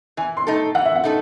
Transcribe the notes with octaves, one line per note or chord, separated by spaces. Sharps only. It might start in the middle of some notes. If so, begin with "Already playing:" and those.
E3 G#5
C6
A3 D#4 A4
E3 F#5
E5
F#5
A3 D#4 A4